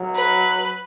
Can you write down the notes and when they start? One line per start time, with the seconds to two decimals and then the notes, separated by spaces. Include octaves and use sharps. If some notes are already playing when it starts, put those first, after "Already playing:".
Already playing: F#3
0.15 B4